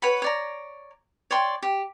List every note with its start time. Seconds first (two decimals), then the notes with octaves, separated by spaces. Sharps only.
0.02 B4 C#5 F#5 B5
0.22 C#5 D5 A#5
1.31 C#5 D5 G5 C6
1.63 G4